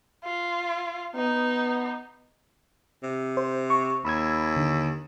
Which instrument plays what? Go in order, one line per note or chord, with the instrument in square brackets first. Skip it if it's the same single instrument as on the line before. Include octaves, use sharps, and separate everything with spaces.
[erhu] F4
[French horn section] B3 [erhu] D#4
[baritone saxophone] C3
[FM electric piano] C5
C#6
[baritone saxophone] D#2 [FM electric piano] B5 E6 G#6
[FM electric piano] D3